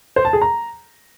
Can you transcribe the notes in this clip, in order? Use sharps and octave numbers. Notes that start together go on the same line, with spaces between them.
C5
A5
G#4
A#5